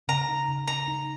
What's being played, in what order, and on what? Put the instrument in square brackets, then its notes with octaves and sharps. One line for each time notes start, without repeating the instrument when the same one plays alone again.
[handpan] C#3 [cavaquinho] A#5
[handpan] D#4
C#3
[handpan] C#3 [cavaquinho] A#5
[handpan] D#4